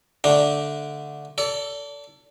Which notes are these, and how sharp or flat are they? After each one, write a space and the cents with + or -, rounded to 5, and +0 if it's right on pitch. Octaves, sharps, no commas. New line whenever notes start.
D3 +0 A3 +0 D4 +0
A4 +20 D5 -30